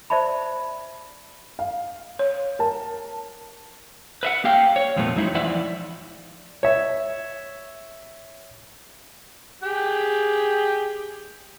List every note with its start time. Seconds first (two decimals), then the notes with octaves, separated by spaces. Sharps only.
0.10 C5 D5 E5 A5 B5
1.59 F5
2.19 C#5
2.59 A#4 A5
4.23 B4 E5 F#5
4.44 A#3 G4 F5 G5
4.76 C#5
4.96 F2 A#2 F3 A3 B3
5.15 E2 F#3 G#3 D#4 E4 C#5
5.34 E3 F3 E4 D5 E5 F#5
6.63 C#5 E5
9.63 G4 G#4 G5